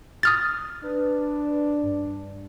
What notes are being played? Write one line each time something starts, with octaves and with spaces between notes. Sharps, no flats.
D#6 F6 A6
D4 B4
G2